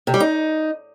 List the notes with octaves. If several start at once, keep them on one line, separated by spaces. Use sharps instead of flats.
C3
G3
D#4